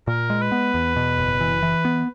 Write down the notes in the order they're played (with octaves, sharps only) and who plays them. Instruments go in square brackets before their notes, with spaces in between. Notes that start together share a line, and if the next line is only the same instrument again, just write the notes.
[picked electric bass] A#2 [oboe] A#4
[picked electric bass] G#3
[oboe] B4
[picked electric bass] B3
E2
B2
F#1
E3
E3
B3